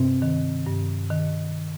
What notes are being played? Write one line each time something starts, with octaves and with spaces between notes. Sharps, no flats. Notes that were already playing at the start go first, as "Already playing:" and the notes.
Already playing: G2 C3 C4
D#3
G2
D#3